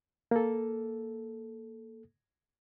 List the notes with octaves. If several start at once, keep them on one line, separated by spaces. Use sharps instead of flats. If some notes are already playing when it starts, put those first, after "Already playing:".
A#3 A4